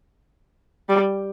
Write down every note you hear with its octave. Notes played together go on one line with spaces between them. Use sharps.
G3